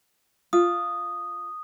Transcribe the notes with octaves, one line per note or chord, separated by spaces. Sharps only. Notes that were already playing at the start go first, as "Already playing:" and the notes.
F4 D#6